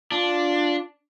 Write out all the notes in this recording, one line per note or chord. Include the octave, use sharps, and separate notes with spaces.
D4 F4